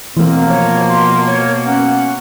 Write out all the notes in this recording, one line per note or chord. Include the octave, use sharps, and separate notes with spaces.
B2 E3 A3 A#3 C4
F3 C#5
C6
C#5
C#4 F#5